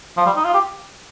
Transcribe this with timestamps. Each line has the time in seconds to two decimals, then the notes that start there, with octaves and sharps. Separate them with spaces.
0.17 F3
0.26 G3
0.36 D#4
0.44 F4
0.54 G4